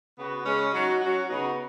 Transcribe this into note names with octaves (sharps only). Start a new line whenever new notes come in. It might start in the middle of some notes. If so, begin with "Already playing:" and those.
C#3 B3 F#4
C#3 G#3 C#4
F#3 D#4 F#4
F#3 C#4 F#4
C#3 B3 D#4 F#4